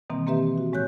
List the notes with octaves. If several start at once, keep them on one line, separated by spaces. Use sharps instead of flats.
B2 D#3 E3 G3 A#3 C4
A#3 C4 G4 B4 E5
F#4
A2 G#3 C#5 F#6 G6